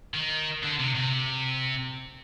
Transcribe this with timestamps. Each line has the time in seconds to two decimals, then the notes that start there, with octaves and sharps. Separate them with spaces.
0.14 D#3
0.63 D3
0.79 C3
0.95 C3